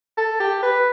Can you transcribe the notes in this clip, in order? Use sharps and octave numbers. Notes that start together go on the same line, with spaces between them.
A4
G4
B4